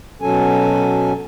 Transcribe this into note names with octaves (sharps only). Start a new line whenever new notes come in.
B2 F#3 C#4 A4 G#5